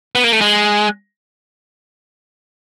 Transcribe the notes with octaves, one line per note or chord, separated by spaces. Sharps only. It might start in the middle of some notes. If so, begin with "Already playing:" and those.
B3
A#3
A3
G#3